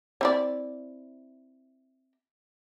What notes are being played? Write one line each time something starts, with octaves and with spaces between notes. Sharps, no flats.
C4 E4 D5